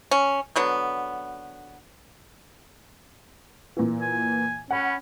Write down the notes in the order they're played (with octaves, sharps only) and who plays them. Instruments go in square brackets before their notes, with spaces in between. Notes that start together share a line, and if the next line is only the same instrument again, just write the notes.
[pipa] C#4
D3 F#3 B3
[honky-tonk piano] A#2 E3
[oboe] G#5
[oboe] C#4 [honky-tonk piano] F#5 B5